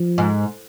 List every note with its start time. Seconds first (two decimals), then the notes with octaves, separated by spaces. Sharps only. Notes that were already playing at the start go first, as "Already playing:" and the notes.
Already playing: F3
0.18 G#2